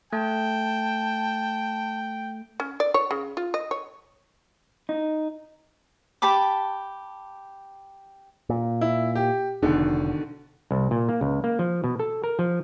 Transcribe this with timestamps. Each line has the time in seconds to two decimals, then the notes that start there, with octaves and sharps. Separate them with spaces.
0.13 A3 G5 A5
2.60 C#4
2.80 D5
2.94 C#5
3.11 C#3
3.37 F4
3.54 D#5
3.71 C#5
4.89 D#4
6.22 G4 A5 B5 D6
8.49 A#2
8.81 E4
9.16 G4
9.62 F1 B2 D3 D#3
10.71 C2
10.91 A#2
11.09 A#3
11.21 C#2
11.44 A#3
11.59 F3
11.84 B2
11.99 A4
12.24 A#4
12.39 F3